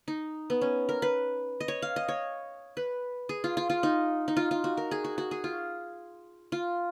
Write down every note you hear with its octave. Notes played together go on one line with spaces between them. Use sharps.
D#4
B3
C#4
A#4
B4
D#5
C#5
F5
D#5
C#5
B4
G#4
F4
F4
F4
D#4
D#4
F4
F4
F#4
A#4
G#4
F#4
F#4
G#4
F4
F4